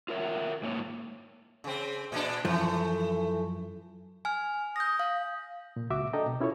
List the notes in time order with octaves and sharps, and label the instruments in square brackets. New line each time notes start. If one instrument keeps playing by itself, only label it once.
[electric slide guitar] F4 A#4 C#5 E5
G#2 A#3 C#5
[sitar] C#3 C4
A#2 D4
[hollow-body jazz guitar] F#2 F3 [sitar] E3 A3
[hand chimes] G#5 F6
[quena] D#6 [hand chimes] G6 A#6
[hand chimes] F5
[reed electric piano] A#2
C#2 F#4 E5 D6
D4 A4 D#5 G5 A#5
B2
C#4 E4 F4 A4 C#5